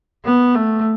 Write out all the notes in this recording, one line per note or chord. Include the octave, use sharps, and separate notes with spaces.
B3
A3